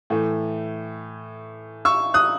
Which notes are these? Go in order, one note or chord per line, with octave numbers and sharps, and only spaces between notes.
A2 E3 A3
C#6 E6
D#6 F#6